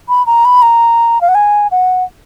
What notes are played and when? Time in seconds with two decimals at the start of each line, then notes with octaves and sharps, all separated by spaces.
0.09 B5
0.27 A#5
0.45 B5
0.62 A#5
1.21 F5
1.29 F#5
1.35 G#5
1.71 F#5